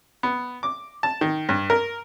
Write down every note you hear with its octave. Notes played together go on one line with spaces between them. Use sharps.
B3
D6
A5
D#3
G2
A#4